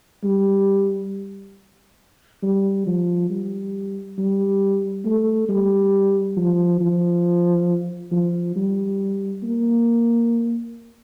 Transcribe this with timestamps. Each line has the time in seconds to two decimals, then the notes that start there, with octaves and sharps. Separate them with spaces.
0.24 G3
2.43 G3
2.87 F3
3.31 G3
4.18 G3
5.05 A3
5.49 G3
6.37 F3
6.81 F3
8.12 F3
8.56 G3
9.43 A#3